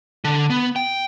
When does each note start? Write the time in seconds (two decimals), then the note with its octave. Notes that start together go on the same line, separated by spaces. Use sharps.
0.25 D3
0.50 B3
0.76 G5